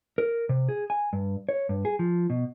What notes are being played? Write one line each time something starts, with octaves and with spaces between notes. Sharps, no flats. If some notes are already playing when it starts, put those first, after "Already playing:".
A#4
C3
G#4
G#5
G2
C#5
G2
G#4
F3
B2